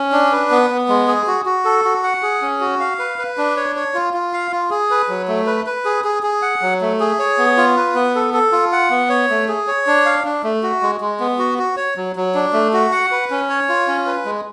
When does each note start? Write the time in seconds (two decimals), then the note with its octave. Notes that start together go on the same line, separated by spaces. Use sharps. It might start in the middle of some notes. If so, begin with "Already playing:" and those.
Already playing: C#4
0.12 D4
0.32 B4
0.51 B3
0.70 B3
0.89 G#3
1.07 G#4
1.27 F#4
1.46 F#4
1.65 A4
1.85 F#4
2.03 F#5
2.22 G#4
2.42 C#4
2.61 F#4
2.80 F5
2.99 B4
3.19 B4
3.38 D4
3.57 C#5
3.76 C#5
3.94 F4
4.14 F4
4.33 F5
4.51 F4
4.70 G#4
4.90 B4
5.09 F#3
5.28 A3
5.47 B4
5.66 B4
5.85 G#4
6.04 G#4
6.23 G#4
6.42 F#5
6.62 F#3
6.81 A3
7.00 G#4
7.19 C#5
7.38 B3
7.57 F4
7.76 B4
7.95 B3
8.15 A4
8.34 A4
8.52 F4
8.72 F#5
8.90 B3
9.09 C#5
9.30 A3
9.48 G#4
9.67 C#5
9.87 D4
10.06 F5
10.25 D4
10.43 A3
10.63 F#4
10.82 G#3
11.01 G#3
11.20 B3
11.39 F#4
11.58 F#4
11.77 C#5
11.96 F#3
12.16 F#3
12.35 D4
12.53 A3
12.73 F#4
12.92 F#5
13.11 B4
13.30 C#4
13.49 C#5
13.69 F4
13.88 C#4
14.06 B4
14.25 G#3